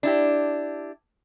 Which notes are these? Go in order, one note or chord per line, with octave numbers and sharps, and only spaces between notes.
D4 E4 G4